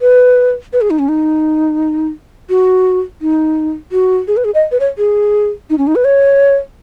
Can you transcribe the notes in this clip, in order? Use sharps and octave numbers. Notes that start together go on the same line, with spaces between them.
B4
B4
G#4
D#4
C#4
D#4
F#4
D#4
F#4
G#4
B4
G#4
D#5
B4
C#5
G#4
D#4
C#4
D#4
B4
C#5